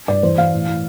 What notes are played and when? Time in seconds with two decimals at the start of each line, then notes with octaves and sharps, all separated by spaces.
0.08 G2 D5
0.23 E2 C5
0.38 E2 F5
0.53 A2
0.67 A2